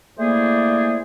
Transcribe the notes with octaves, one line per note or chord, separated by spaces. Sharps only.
A3 A#3 E4 G#4 C5 D5